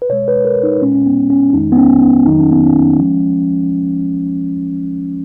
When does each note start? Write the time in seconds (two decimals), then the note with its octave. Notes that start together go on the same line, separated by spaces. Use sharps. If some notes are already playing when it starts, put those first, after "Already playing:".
0.02 B4
0.09 B2 G#3 C#5
0.28 B4
0.45 A#4
0.63 D#4
0.81 A#2 G#3 C#4
0.95 C#4
1.06 B3
1.30 C#4
1.50 C#4
1.53 F2 D#3 G#3 D#4
1.72 B3
1.77 C#4
2.01 B3
2.26 F2 D#3 F#3 A#3 D#4
2.40 C#4
2.51 B3
2.66 C#4
2.99 F3 G#3